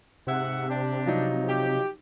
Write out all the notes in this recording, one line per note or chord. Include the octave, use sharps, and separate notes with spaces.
G#2 C3 E5 F#5
D4 G4
F3 F#3 D#4
G4